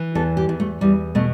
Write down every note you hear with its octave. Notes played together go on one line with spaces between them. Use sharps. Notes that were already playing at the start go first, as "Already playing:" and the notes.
Already playing: E3
E2 A4
G4
E2
A3
E2 G3
B2 A3